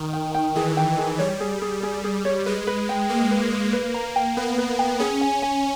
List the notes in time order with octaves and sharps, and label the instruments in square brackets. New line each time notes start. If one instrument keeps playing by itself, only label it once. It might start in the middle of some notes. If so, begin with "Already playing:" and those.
Already playing: [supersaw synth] D#3
[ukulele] G5
G5
[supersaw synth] E3 [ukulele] G#4
[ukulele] G5
G#4
[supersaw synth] G3 [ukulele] C#5
[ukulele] G#4
G#4
G#4
G#4
C#5
[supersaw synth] G#3 [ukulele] B4
[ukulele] B4
G5
[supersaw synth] A#3 [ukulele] B4
[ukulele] B4
B4
B4
A#5
G5
[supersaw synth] B3 [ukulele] B4
[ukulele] B4
G5
[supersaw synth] C#4 [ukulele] G#4
[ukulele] G#5
G#5